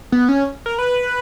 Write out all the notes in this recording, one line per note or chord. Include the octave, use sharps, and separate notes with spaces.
B3
C#4
A#4
B4